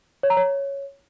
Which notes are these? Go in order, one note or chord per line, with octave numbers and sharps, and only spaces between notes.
C#5
A#5
C#5